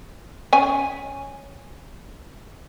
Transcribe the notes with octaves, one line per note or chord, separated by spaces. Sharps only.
C#4 G#5